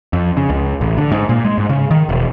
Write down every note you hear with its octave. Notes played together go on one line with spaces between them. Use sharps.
F2
C#3
C#2
A1
D3
G#2
A#2
G#3
G#2
C#3
D#3
E1